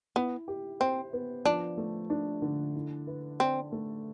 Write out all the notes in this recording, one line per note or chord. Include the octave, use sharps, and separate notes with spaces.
B3 E4
G4
C4 C5
B3
F3 D4
A3
D4
D3
E4
B4
C4 D5
A3